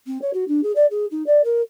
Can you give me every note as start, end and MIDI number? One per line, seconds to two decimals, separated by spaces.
0.06 0.20 60
0.21 0.30 73
0.33 0.47 66
0.47 0.60 62
0.63 0.72 68
0.75 0.86 74
0.90 1.05 68
1.10 1.25 63
1.26 1.41 74
1.44 1.61 70